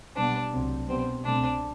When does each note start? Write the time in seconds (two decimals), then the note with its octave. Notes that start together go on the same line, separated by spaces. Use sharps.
0.16 B2 G3 B3 D4
0.52 C2 C3 F#3 A3 C4
0.88 B2 G3 B3 C4
1.24 C2 B2 A3 C4 D4